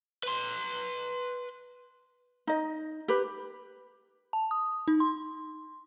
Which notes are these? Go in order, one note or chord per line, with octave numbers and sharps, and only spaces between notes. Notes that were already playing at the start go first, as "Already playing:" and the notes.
B4 C6
D#4 D#5
G4 B4
A5
D#6
D#4
C6